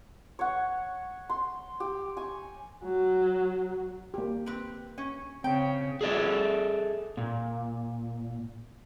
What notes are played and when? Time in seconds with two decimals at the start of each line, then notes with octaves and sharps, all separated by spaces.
0.39 C#5 F#5
1.30 C6
1.80 G4
2.17 G#5 C#6
2.84 F#3
4.14 A#3 G4
4.46 C4 B4
4.98 C#4
5.44 C#3 C4 G5
6.01 G#4 A4 D5 E5
7.17 A#2